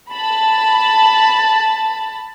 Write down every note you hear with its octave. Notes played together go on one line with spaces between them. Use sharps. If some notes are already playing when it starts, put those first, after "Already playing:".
A5 B5